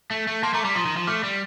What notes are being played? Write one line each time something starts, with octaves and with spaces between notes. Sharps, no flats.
A3
A3
A#3 A5 C6
A3 A#5 D6
G3 A#5 D6
F3 C6 D#6
D#3
F3
A3 D6 F6
G3